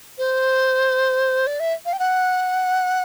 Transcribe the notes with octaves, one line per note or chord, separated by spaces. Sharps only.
C5
D5
E5
F5
G5
F#5